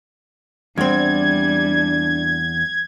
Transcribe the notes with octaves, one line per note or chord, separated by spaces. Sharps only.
E2 G3 C4 D4 G#6